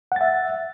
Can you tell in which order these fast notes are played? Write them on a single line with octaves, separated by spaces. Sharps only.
F#5 A6 E5